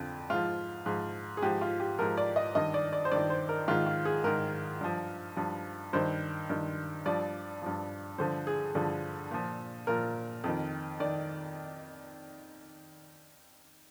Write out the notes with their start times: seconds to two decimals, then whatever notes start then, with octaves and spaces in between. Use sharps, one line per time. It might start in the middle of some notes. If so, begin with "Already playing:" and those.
Already playing: F2 D3 F3
0.30 G#2 F3 F4
0.86 G#2 F3
1.37 G#4
1.42 G#2 F3 G4
1.61 F4
1.80 G4
1.99 G#2 F3 A#4
2.17 D5
2.36 D#5
2.55 G2 D#3 D#5
2.74 D5
2.93 D5
3.05 C5
3.12 G2 D#3 D5
3.30 C5
3.49 A#4
3.68 G#2 D#3 F4
3.86 F4
4.05 G#4
4.24 G#2 D#3 A#4
4.81 G2 F3
5.36 G2 F3
5.93 G2 D#3 C5
6.49 G2 D#3
7.05 G2 F3 D5
7.62 G2 F3
8.18 G2 D3 F3 C5
8.47 G#4
8.75 G2 D3 F3
9.31 A#2 F3
9.87 A#2 F3 A#4
10.44 F2 D#3
11.00 D#3 D5